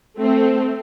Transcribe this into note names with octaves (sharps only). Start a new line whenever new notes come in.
A3 C4